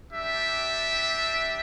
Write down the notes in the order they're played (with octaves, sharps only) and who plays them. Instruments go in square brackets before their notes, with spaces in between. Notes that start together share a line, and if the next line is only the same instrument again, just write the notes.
[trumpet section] G3 D4 G4 E5